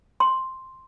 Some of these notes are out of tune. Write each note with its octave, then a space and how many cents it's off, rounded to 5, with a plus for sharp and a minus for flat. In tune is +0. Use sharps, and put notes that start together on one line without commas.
C6 +0